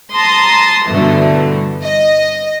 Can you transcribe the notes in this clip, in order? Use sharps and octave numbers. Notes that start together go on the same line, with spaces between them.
A5 A#5 C6 D#6
G2 B2 D3 E3 A3
D#5